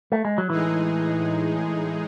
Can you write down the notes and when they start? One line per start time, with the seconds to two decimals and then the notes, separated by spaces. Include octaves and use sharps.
0.12 A3
0.25 G#3
0.38 F#3
0.50 A2 E3 G#3 D#4 G#4